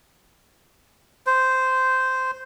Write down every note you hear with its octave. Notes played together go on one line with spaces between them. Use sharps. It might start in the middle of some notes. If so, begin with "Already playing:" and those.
C5